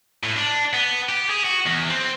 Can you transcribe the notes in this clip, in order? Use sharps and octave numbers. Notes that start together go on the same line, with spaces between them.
A2
D4
B3
G4
G#4
F#4
E2
C4